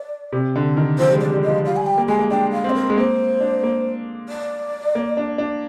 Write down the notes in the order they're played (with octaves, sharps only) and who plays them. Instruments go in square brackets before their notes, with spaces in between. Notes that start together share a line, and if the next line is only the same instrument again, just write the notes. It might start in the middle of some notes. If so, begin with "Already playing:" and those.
Already playing: [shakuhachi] D5
[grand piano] C3
D3
D#3
[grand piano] F3 [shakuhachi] C5
[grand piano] G3
G#3
[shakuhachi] D5
[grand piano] G3
[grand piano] F3 [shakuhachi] D#5
[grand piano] G3 [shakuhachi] F5
[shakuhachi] G#5
G5
[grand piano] A#3
[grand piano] G#3 [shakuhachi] G#5
[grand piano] A#3
[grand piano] D4 [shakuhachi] G5
[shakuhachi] F5
[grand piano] C4
[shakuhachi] C5
A#4
[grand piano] G#3
[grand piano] A#3 [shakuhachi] C5
[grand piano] D4
A#3
[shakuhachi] D5
[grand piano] A#3
D4
D4